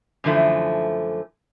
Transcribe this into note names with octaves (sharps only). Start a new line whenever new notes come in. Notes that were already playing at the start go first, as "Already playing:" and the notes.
F#2 D3 E3 F3 A3